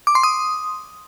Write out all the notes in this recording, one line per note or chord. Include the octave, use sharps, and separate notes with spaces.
D6
C6
D#6